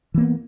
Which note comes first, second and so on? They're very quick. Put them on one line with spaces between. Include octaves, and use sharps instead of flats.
E3 A#3 B3